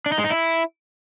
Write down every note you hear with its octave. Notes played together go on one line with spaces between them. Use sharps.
D4
D#4
G#3
D#4
E4